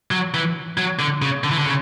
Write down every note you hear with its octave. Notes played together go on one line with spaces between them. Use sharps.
F#3
E3
F#3
D3
C#3
D3
E3
D3
C#3